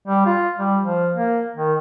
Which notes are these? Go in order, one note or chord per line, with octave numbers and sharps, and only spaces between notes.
G3
F4
G3
F3
A#3
D#3